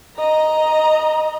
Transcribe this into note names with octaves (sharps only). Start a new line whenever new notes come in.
D#5 A#5